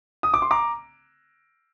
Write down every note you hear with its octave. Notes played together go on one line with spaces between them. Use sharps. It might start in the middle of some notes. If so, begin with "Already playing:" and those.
D#6
D6
C6
A#5 D6